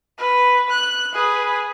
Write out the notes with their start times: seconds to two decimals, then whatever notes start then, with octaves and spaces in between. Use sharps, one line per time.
0.18 B4
0.71 F#6
1.13 G#4 B4